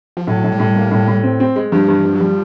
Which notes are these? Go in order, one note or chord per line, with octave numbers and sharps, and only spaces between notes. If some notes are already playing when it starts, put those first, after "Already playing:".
F3
A2 F#3
A2
G3
A2
A#3
A2
A2
C4
C4
G#3
G2 F3
G2 E3
G2 F3
F#3
F3 G3